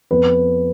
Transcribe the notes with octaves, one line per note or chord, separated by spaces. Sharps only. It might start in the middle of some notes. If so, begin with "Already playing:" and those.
F2 F3 B3 B4